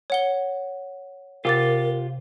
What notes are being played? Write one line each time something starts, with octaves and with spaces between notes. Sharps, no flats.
C#5 F#5 G7
C3 F4 G4 A#4 D6 A6